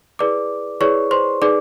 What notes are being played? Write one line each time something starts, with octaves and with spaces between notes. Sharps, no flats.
E4 G#4 B4 D5 D6
E4 G#4 B4 C#5 D5 C#6
C5 C6
D#4 G#4 B4 D5 D6